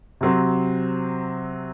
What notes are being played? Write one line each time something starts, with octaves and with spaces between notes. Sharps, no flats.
C3 F#3 C4